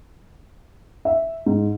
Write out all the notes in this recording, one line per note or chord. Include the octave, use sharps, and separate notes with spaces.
E5
G#2